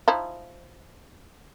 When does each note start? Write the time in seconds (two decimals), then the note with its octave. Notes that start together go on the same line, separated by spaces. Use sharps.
0.08 F3 D#4 E4